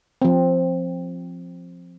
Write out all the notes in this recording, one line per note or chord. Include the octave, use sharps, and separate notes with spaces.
F3 C4